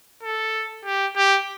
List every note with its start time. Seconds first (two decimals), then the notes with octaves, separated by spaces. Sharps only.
0.23 A4
0.85 G4
1.16 G4